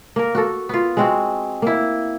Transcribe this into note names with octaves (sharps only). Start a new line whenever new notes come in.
A#3 A#4
F#4 A4
B3 F4
G#3 C4 F#4
A#3 E4